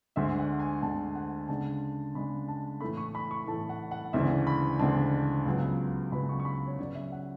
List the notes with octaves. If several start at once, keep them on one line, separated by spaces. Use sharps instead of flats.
D2 D3 G#3 E5
F#5
G#5
D2 D3 G#3 A5
F#5
C#3 G#3 D4 A5
C#3 G#3 D4 B5
A5
A2 E3 A3 B5
C#6
B5
C#6
A2 E3 A3 A5
F#5
F#5
D2 C#3 E3 G#3 D4 E5
B5
D2 C#3 E3 G#3 D4 A5
C#2 C#3 F#3 B3
C#2 C#3 F#3 B3 B5
C#6
C#6
B5
C#5
C#3 F#3 C#4 D5
E5
F#5